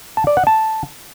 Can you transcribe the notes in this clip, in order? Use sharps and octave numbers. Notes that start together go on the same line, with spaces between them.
A5
D5
F#5
A5